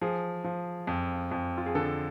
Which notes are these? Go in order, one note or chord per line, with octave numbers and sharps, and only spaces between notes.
F3 G#4
F3
F2
F2
F4
G#4
D3 A4